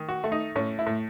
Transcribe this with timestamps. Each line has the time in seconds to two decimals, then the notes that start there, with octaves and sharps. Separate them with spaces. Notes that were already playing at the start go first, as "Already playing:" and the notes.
Already playing: D#3
0.09 F#4
0.24 A3
0.32 D#4
0.56 A2 C#4
0.79 E4
0.86 A2